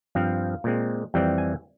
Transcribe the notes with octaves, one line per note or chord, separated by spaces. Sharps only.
G2 F3 C4 F5
A#2 G#3 C4
F2 E3 G3 C4 G5
G#5